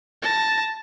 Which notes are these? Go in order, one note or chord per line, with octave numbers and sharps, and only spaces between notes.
A5 A#6